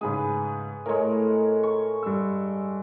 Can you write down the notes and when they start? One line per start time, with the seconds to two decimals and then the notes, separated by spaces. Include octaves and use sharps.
0.01 G#2 C#3 G#3 G#4 B4
0.86 A2 G#3 A#4 C#5
1.63 C#6
2.03 G2 E6